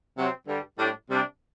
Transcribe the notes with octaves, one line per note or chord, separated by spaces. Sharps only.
C3 F#3 C4
G2 D3 G3
A2 G3 D4
C3 G3 D4